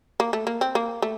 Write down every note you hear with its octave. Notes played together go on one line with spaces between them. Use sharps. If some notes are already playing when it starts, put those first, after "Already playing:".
A#3
A3
A#3
C4
A#3
A3